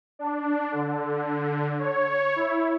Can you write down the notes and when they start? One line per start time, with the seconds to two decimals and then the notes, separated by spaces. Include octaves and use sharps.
0.19 D4
0.72 D3
1.79 C#5
2.36 E4